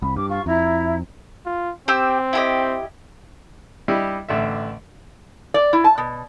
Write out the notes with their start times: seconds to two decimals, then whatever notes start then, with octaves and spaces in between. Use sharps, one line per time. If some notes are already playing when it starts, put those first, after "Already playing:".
0.02 C2 B5
0.16 G2 D6
0.29 F4 C#6
0.46 F2 E4 E5 A#5
1.46 F4
1.88 C4 G4 G5 E6
2.33 E4 G4 D#5
3.88 G3 D4 E4 G4 D#5
4.29 A1 D3 E5
5.54 D5
5.73 E4
5.84 A5
5.98 B2